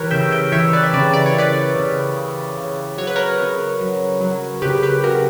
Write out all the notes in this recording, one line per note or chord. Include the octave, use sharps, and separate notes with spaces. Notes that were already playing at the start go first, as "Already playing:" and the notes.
Already playing: E3 G4 A#4 B4 C#5
C#3 E5 G5
E5 G5
E3 C#5 E5
B4 D5
E5
C#3 B4 D5
D5
C#5
C#3 B4 D5
C#3
C#3
C#3
F#3 C#5
B4
A#4 C#5
C#3
F#3
F#3
C#3 G4 B4
G4 B4
C#3 F#4 A#4